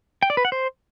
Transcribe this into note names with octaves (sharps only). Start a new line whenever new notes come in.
G5
D5
B4
F#5
C5